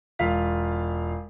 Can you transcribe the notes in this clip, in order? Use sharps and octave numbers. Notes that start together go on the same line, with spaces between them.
E1 F4 F5 B6